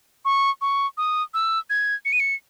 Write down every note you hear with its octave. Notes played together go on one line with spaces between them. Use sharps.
C#6
C#6
D#6
E6
G#6
C#7
D#7
C#7